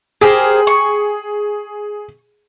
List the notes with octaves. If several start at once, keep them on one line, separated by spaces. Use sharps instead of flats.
G4 G#4 A#4 C5
C#6